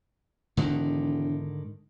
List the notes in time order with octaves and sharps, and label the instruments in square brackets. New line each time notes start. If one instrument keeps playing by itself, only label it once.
[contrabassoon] E1 [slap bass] G#2 D3 D#3